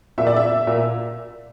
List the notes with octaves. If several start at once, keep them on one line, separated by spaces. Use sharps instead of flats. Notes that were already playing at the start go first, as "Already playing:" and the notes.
A#2 E5
D5
E5
A#2